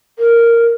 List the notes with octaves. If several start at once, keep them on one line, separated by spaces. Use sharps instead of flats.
A#4